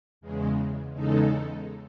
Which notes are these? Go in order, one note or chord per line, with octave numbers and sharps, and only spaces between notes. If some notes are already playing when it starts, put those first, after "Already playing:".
E2 C#3 G#3
E2 C#3 G#3 D#4 A4